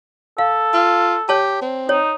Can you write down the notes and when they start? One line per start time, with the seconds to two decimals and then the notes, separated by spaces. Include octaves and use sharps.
0.38 A4 F5
0.74 F4
1.29 G4 C#5 A5
1.62 C4
1.89 D#4 C#5